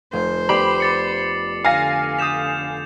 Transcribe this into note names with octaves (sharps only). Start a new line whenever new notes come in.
F1 C5
B3 G4 D5 B5 D6 C7 F#7
D6 A6 C#7
D3 F5 G#5 A#6
D#6 G6 B6 E7 F7